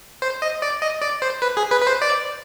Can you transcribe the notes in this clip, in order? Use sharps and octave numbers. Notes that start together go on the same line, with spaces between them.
C5
D#5
D5
D#5
D5
C5
B4
G#4
B4
B4
C5
D5